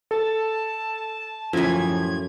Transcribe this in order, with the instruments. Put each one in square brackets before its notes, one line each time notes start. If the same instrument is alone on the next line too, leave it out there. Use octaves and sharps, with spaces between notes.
[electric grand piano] A4 [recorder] A5
[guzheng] F#2 E3 [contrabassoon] A2 [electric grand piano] F3 [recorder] G#6